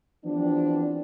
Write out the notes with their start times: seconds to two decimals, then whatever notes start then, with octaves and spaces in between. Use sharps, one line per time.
0.25 E3 F3 G3 B3 C4 D4